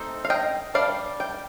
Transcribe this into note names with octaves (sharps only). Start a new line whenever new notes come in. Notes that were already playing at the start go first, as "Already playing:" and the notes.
Already playing: A3 C4 D#4 A4 C5
F5
D#5 G5
G3 D4 D5 F5
G5